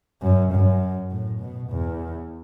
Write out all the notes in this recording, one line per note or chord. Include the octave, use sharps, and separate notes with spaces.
F#2
F#2
A2
B2
E2